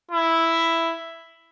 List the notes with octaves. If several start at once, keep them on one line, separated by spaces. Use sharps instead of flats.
E4